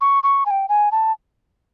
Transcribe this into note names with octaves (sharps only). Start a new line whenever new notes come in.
C#6
C#6
G#5
G5
G#5
A5